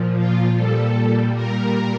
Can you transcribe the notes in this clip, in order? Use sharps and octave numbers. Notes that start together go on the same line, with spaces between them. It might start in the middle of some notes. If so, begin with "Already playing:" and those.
Already playing: A#2 F3
F4
A#2 G3 A4
A#2 G3 A#4